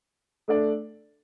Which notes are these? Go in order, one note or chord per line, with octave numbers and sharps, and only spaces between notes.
A3 D4 A4 D5